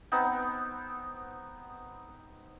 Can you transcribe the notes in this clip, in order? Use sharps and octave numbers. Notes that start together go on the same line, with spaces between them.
B3 C4 D#4